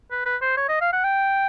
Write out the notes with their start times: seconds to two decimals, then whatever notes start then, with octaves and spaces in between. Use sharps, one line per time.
0.11 B4
0.26 B4
0.42 C5
0.57 C#5
0.69 D#5
0.81 F5
0.93 F#5
1.04 G5